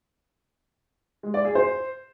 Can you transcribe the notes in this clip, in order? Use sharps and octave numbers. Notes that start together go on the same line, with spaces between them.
G#3
D5
G#4
C5